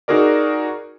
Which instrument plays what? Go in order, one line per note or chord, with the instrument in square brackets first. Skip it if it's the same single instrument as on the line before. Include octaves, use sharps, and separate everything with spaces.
[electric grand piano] D#4 F#4 G#4 A#4 D5